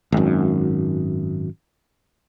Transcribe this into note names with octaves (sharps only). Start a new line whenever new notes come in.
G#1 F#2